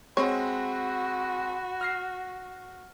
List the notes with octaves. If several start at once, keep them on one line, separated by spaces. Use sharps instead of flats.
G#3 C4 F#4 C#5 B5
F6 A#6 C7